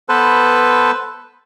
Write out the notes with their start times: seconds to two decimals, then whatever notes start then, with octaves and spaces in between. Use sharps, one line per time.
0.09 B3 A4 B4 C5